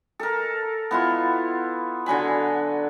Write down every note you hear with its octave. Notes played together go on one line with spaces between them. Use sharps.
A4 A#4
B3 E4 F4
D3 F#3 G#5 B5